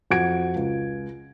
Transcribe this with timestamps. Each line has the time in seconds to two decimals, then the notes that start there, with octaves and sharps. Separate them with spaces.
0.11 F2 F#4 F#5 G#6 D7
0.56 C#2